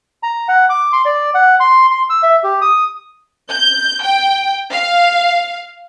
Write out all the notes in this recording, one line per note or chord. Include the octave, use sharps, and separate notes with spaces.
A#5
F#5
D6
C6
D5
F#5
C6
C6
E6
E5
G4
D#6
G6
G5
F5